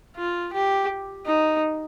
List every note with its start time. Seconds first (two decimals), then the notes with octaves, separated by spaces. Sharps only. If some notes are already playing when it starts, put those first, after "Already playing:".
0.16 F4
0.53 G4
1.26 D#4